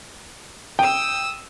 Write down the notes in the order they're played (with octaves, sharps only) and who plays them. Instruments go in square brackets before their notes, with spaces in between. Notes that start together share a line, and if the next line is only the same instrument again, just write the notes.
[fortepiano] G5 [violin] D#6 E6